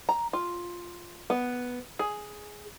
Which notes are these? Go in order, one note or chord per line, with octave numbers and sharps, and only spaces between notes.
A#5
F4
B3
G#4